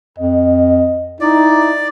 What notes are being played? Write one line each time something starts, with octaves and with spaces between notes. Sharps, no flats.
F2 D#5
D#4 E4 D5